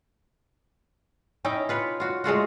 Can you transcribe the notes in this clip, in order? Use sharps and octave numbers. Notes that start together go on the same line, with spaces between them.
C#4 D#4 E4 G5
F4 B4 C#5
F4 F#4
G#3 A3 F4 F#4